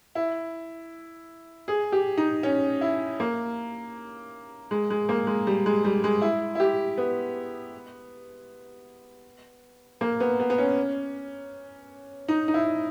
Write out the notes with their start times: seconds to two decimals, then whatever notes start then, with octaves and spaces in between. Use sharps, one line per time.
0.15 E4
1.68 G#4
1.92 G4
2.18 D#4
2.43 C#4
2.81 E4
3.20 A#3
4.71 G#3
4.90 G#3
5.09 A#3
5.27 G#3
5.47 G3
5.66 G#3
5.85 G3
6.04 G#3
6.22 E4
6.55 E4
6.60 G4
6.98 B3
10.01 A#3
10.20 B3
10.40 B3
10.50 B3
10.58 C#4
12.28 D#4
12.48 D#4
12.54 E4